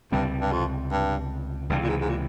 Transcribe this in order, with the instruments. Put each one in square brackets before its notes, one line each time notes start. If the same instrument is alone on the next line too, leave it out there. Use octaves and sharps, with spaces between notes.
[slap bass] C#2 C3 G3 C4 [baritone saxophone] G2
[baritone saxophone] G2
F2
G2
[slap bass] C#2 C3 E3 [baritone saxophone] G2
[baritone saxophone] A#2
G#2
G#2
A#2